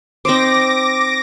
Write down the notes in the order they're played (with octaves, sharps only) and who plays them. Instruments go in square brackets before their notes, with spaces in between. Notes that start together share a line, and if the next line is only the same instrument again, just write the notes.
[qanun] C4 D#4 C5 [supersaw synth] D6 A#6